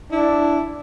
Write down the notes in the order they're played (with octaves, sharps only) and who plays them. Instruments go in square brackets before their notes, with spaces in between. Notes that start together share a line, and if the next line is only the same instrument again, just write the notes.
[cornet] D4 [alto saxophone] E4